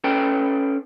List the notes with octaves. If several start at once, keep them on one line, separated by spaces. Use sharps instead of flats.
C#4 A4 B4 G5